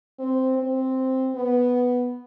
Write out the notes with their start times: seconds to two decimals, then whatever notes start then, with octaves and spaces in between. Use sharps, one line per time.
0.19 C4
0.58 C4
1.35 B3